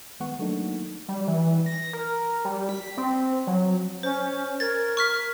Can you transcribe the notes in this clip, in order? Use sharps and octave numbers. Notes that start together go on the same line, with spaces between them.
D#3 G#3 B3 F#5 C#6
F#3 A3 A#3 D4 D#4 A4
G3
E3
A#6
A#4
G3
B6
C4
F#3
C#4 C5
A#4 G#6 A6
C#6 F6 B6